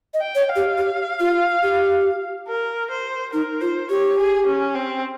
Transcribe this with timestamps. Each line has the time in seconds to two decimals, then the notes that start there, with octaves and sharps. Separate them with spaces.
0.14 D#5
0.21 G5
0.35 C#5
0.49 F5
0.56 G4
0.78 G4
1.20 F4
1.63 G4
2.47 A#4
2.91 C5
3.33 D#4 A#4
3.61 F4 C5
3.90 G4 C#5
4.18 G#4
4.47 C#4
4.75 C4